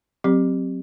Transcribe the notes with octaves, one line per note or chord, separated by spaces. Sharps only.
F#3 C4 G4